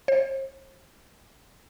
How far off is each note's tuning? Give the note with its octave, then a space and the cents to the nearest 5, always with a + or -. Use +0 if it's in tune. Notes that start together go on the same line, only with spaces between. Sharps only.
C5 +40